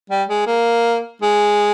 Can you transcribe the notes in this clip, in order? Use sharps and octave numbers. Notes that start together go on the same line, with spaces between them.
G3
G#3
A#3
G#3